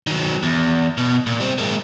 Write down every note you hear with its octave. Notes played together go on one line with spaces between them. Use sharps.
D#3 F#3
E2
B2
A#2
G3 C4
G#3 A#3